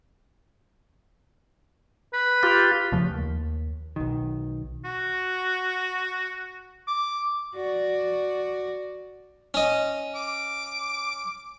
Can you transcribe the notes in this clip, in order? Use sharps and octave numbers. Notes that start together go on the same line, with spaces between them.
B4
F4 G4
E2 C#3 F3 A3
D#2
B1 D#3
F#4
D6
F#4 D5
C#4 D#5
D6